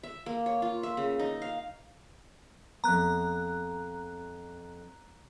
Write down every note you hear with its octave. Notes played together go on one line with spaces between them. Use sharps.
E5
A#3
C#5
F4
E5
C#3
D#4
F5
F2 B3 A#5 F#6